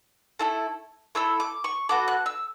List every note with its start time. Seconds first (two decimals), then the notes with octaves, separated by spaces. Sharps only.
0.39 A3 E4 A4
1.15 A3 E4 A4 E6
1.40 D6
1.64 C#6
1.89 B3 F#4 A4 D6
2.08 F#6
2.26 E6